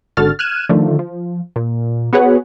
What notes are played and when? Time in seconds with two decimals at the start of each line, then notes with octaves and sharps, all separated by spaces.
0.17 G#1 D3 F#4 A4 F6 A6
0.39 F6 F#6 G#6 D#7 E7
0.69 D3 D#3 F3 A3
0.99 F3
1.56 A#2
2.13 B3 F#4 G#4 B4 C#5 F#5